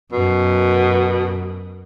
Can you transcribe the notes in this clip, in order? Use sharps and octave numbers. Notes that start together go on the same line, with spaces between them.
F#2 B2